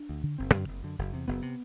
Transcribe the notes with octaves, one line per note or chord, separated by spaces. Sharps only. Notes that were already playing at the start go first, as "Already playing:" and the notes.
Already playing: D4
D2
D3
F#1 C4
F#2 D3
F#1
F#2 D3
F#1
E2 C3
F#1 B3
C3